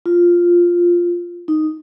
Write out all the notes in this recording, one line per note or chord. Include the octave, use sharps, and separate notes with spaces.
F4
D#4